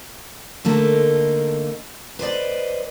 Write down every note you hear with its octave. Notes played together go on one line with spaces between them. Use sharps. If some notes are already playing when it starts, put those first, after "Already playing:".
D3 A3 A#3 D#4
B4 C5 D5 D#5